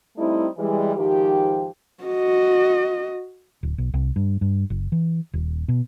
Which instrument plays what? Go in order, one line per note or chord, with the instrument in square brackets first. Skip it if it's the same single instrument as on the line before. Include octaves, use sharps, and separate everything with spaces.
[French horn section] G3 A3 C4 D#4 E4
E3 G3 G#3
G#2 D#3 F3 G4
[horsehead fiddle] F#4 D#5
[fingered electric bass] D1
B1
C2
G2
G2
F#1
E3
D#1
B2